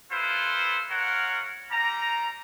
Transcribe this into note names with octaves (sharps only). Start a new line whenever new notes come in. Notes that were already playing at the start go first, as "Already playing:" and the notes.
E4 F4 A4 B4 C5
F4 A#4 C#5 F#5
G3 A#5